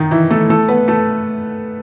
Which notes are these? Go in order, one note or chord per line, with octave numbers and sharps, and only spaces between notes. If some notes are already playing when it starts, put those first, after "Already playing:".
Already playing: D#3 D#4
E3 E4
A3 A4
A3 A4
B3 B4
A3 A4